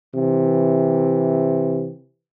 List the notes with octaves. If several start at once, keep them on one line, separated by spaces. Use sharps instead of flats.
C3 E3